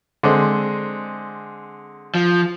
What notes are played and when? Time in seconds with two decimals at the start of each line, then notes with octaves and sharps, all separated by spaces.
0.23 D3 G#3 C4
2.15 F3